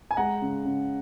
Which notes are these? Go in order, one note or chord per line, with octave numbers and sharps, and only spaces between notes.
G#5
G#3 F#5 A#5
C#3
C#3